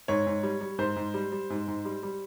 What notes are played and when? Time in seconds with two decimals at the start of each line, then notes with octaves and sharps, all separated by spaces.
0.08 G#2 C#5
0.27 G#2
0.43 G3
0.61 G3
0.78 G#2 C5
0.96 G#2
1.14 G3
1.32 G3
1.50 G#2
1.68 G#2
1.85 G3
2.03 G3